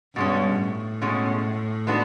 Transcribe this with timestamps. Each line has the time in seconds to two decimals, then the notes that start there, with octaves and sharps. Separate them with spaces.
0.16 G2 B2 G#3 C#4
0.59 A2
1.02 B2 G#3 C#4
1.87 G#3 B3 D4 F#4